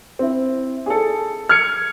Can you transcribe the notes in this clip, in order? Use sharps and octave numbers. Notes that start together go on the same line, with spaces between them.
C4 E4
G#4 A4
F6 G#6 C#7